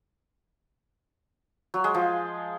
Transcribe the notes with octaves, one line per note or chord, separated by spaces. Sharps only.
F#3
G#3
F3